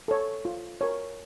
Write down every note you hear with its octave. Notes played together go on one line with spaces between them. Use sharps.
A4 C#5
F4
A#4 C#5